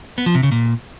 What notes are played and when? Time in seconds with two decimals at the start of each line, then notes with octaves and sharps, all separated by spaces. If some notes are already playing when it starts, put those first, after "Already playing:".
0.18 B3
0.26 F3
0.35 C3
0.43 C#3
0.52 A#2